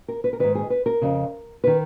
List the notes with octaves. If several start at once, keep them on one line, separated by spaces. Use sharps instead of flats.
A#4
B4
A#4
G#2 D#3 B4
G#4
B4
A#4
F2 C#3
D#3 B4